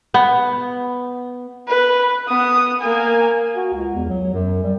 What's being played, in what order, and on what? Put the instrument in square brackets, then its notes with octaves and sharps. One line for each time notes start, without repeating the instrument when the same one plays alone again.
[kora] B3
[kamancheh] B4
B3 D#6
A#3 G#5
[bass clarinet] F#4
C#2
E2
F#3
F#2
G3